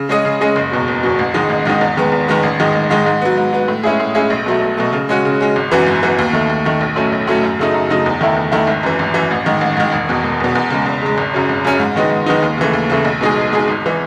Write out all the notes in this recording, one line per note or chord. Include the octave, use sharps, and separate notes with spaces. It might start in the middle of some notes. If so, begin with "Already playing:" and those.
Already playing: C#3
G#3 C#4 G#4 D#5
C#3
G#3 C#4 G#4 D#5
F#1
E2 B2 F#3
F#1
E2 B2 F#3
A1
G#2 D#3 G#3 D#4
A1
G#2 D#3 G#3 D#4
E2
D#3 G#3 B3
E2
D#3 G#3 B3
A1
G#2 D#3 G#3 D#4
A1
G#2 D#3 G#3 D#4
G#2
F#3 B3
G#2
F#3 B3
A2
G#3 C#4 E4 G#4
A2
G#3 C#4 E4 G#4
B1
B2 F#3 A3
B1
B2 F#3 A3
C#3
G#3 C#4 F#4
C#3
G#3 C#4 F#4
G#1
F#2 E3 B3 F#4
G#1
F#2 E3 B3 F#4
D#2
D#3 A3
D#2
D#3 A3
B1
A2 F#3 A3 C#4
B1
A2 F#3 A3 C#4
F#2
C#3 F#3 A3 D#4
F#2
C#3 F#3 A3 D#4
E2
D#3 A3 E4
E2
D#3 A3 E4
G#1
F#2 E3
G#1
F#2 E3
A1
G#2 D#3
A1
G#2 D#3
E1
E2 B2
E1
E2 B2
E2
C#3 G#3
E2
C#3 G#3
G#1
F#2 C#3 F#3 C#4
G#1
F#2 C#3 F#3 C#4
G#2
D#3 G#3 B3 D#4
G#2
D#3 G#3 B3 D#4
D#2
C#3 E3 A3
D#2
C#3 E3 A3
B1
B2 G#3 D#4 G#4
B1
B2 G#3 D#4 G#4
G#1
E3